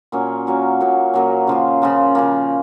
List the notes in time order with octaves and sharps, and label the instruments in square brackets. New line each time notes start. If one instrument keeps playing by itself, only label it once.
[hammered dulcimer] A#2 F#3 A#3 C#4
A#2 F#3 A#3 C#4
A#2 F#3 A#3 C#4
A#2 F#3 A#3 C#4
C#3 F3 A#3
C#3 F3 A#3
C#3 F3 A#3